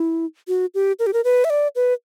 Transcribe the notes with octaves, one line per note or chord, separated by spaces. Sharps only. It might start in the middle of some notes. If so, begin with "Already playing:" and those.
Already playing: E4
F#4
G4
A#4
G4
A#4
B4
E5
D5
B4